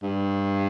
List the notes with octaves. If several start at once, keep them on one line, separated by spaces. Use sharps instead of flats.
G2